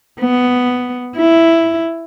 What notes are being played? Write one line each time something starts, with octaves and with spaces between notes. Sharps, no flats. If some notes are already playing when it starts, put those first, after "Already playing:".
B3
E4